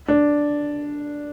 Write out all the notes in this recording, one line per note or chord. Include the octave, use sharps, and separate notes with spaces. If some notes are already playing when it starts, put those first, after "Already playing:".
D4